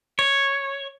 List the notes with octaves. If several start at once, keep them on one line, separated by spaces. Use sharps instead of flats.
C#5